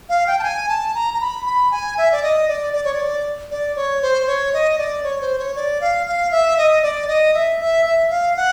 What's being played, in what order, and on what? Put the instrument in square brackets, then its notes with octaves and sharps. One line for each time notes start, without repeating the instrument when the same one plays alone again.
[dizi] F5
G5
A5
G#5
A5
A#5
A#5
B5
B5
G#5
E5
D5
D#5
D5
D5
C#5
D5
D5
C#5
C5
C#5
D#5
D5
C#5
C5
C#5
D5
F5
F5
E5
D#5
D5
D#5
E5
E5
E5
F5
F#5